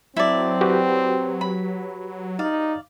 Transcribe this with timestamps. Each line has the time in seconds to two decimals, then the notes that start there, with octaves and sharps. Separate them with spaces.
0.16 F#3 C4 E4 A4 D5
0.61 F#4 G4 B4
1.41 B5
2.39 D#4 D5 F5